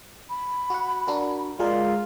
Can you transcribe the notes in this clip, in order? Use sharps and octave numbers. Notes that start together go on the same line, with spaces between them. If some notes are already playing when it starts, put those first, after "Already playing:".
B5
F#4 F#5
D4 F#4 A#4
G#3 F4 G#4 A#4 D5